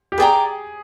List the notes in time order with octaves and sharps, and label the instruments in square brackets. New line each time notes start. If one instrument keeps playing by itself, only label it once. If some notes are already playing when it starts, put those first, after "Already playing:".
[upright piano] G4
[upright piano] G#4 [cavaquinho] B4 D5 G5 A#5